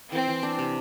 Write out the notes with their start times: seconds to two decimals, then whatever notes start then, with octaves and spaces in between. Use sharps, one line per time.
0.12 E3 C4
0.28 E3
0.43 D4
0.59 C3